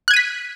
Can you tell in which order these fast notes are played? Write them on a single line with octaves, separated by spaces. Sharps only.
F#6 G#6 D#7 B6